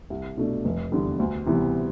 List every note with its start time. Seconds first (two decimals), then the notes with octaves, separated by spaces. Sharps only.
0.10 C2
0.38 B2 A3 D4
0.65 F1
0.92 E2 D3 G3 B3
1.20 D2
1.46 C3 E3 G3 B3